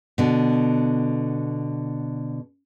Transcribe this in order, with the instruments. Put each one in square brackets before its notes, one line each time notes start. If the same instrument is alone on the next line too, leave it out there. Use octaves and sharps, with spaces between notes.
[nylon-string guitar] B2 D3